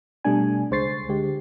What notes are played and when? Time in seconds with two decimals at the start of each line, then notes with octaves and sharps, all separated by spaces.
0.25 B2 G3 A3 D4 G#5
0.71 C#2 G#3 C5 C#6 A6 C7
1.09 D3 G#3 G4